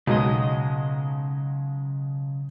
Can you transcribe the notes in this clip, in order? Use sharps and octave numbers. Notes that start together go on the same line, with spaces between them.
B1 C#3 F#3 G#3 D#5